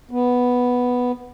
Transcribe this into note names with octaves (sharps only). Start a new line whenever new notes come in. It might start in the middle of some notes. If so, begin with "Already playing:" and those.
B3